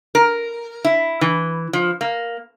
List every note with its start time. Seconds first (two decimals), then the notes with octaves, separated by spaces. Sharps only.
0.15 A#4
0.84 E4
1.21 E3
1.73 F3
2.01 A#3